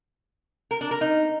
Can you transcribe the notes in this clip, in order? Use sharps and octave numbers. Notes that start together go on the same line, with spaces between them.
A#4
D4
A#4
D#4